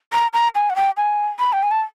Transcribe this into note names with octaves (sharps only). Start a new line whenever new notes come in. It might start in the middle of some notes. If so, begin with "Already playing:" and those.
A#5
A#5
G#5
F#5
G5
G#5
B5
G5
G#5
A5